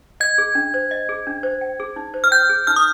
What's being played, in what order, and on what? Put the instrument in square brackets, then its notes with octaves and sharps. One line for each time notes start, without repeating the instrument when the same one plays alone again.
[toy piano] D#5 [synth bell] G#6
[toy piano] G#4
D4
C5
D#5
G#4
D4
C5
G5
G#4
D#4
C5
[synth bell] F6
[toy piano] G5 [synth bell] G6
[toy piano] G#4
[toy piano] D#4 [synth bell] F6
[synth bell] D#6